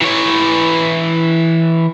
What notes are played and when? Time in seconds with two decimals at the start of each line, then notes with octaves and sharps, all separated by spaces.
0.01 E3 C#5